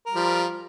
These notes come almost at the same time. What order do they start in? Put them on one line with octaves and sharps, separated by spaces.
A#4 G3 F3